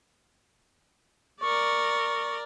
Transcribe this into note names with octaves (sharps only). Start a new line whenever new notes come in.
A#4 D5 C#6